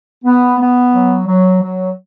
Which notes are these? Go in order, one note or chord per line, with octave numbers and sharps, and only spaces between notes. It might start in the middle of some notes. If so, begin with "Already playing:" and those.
B3
B3
F#3
F#3
F#3